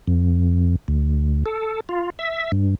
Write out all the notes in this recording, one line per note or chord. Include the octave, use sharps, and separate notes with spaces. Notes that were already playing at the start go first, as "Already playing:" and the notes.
F2
D2
A4
F4
E5
G2